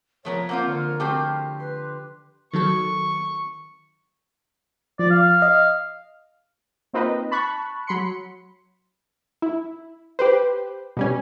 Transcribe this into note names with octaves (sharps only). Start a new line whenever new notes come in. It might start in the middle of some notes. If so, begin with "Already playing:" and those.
F3 A3 B3 A#4 C#5
A#3 C4 F4 F#5
D3 A#4 C#5
A3 C4 F#4 G4
B4 C6
D#3 F#3 A4 C#6
F3 D5
F5
D#5
A#3 C4 D#4 F4 B4 D#5
A5 B5 C#6 F#6
F#3 B5 C6 C#7
E4
G4 B4 C5
B2 G3 C#4